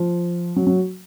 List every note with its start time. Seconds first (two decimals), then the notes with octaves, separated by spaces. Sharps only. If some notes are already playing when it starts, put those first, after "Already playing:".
Already playing: F3
0.56 F#3
0.67 F#3